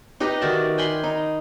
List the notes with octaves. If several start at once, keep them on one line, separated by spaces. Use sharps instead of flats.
D#4 G4 B4 D#5
D#3 F#4 D5 E5
G5 G#5 B5 C6
D#4